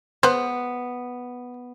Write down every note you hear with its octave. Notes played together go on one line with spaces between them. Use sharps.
B3 B4 C5